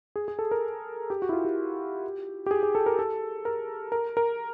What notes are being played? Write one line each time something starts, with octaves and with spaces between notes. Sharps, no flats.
G#4
G#4
A4
A#4
G4
F#4
E4
F4
G4
G4
G#4
G#4
A4
A#4
A4
A#4
A#4
A#4